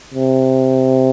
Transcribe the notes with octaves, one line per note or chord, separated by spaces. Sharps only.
C3